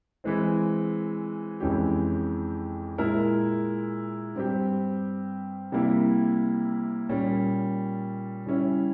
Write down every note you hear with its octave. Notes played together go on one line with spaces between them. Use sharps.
E3 G#3 C4
F2 E3 G#3 C#4 G4
A#2 G#3 E4 A#4
G2 G3 C4 G4
C3 G3 A#3 E4
A#2 G3 C#4
C#3 G3 C#4 E4